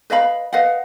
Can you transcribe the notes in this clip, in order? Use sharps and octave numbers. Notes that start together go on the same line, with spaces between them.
B4 D#5 F5 B5
B4 D#5 F5 F#5